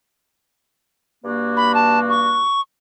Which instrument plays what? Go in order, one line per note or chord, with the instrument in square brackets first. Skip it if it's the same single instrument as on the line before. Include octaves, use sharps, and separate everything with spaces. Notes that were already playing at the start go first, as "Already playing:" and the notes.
[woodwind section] G2 A#3 F#4
[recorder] B5
A5
C#6